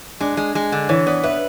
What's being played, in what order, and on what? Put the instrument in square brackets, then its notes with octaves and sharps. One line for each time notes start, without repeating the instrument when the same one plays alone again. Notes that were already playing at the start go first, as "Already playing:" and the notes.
[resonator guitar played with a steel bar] G#3 [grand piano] D4
[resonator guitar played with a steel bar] G#3
G#3
D3
[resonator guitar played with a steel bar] E3 [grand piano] C#5
[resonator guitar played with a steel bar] B3 [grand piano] D5
[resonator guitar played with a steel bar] B4 [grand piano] E5